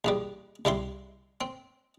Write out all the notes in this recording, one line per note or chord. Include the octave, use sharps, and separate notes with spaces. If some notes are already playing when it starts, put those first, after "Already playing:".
A#1 E2 G3
C2 G3 E4 C6
C4